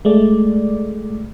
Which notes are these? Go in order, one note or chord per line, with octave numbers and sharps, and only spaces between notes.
G#3 A3 D5